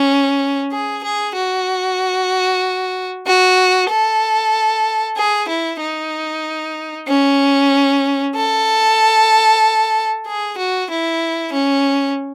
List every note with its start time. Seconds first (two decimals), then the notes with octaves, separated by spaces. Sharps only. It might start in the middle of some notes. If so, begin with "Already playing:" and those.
Already playing: C#4
0.72 G#4
1.04 G#4
1.35 F#4
3.27 F#4
3.90 A4
5.17 G#4
5.49 E4
5.81 D#4
7.08 C#4
8.35 A4
10.27 G#4
10.58 F#4
10.90 E4
11.53 C#4